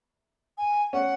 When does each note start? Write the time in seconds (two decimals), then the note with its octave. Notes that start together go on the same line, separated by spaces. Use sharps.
0.58 G#5
0.93 C#4 F#5